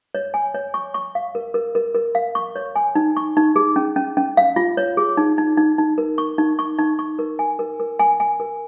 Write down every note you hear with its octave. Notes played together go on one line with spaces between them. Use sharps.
C#5
G#5
C#5
C#6
C#6
F5
A#4
A#4
A#4
A#4
F5
C#6
C#5
G#5
D#4
C#6
D#4
G#4
C#4
C#4
C#4
F5
F4
C#5
G#4
D#4
D#4
D#4
D#4
A#4
C#6
D#4
C#6
D#4
C#6
A#4
G#5
A#4
A#4
G#5
G#5
A#4